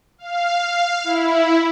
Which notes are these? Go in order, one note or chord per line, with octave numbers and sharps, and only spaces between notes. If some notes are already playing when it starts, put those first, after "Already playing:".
F5
E4